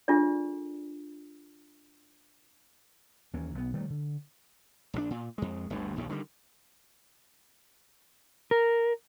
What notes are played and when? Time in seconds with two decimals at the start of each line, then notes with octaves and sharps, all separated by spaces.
0.08 D4 F4 G#4 A4 D5
3.34 D#2 E3 A#3 C#4
3.55 B1 F#3 B3
3.73 D#3 G3 A3 A#3
3.90 D3
4.94 A#1 D#3 D4
5.10 A#2
5.38 F2 G#3
5.70 G1 D2 G2
5.96 A#1 D#2 C#3
6.09 D3 D#3 F#3 G3
8.51 A#4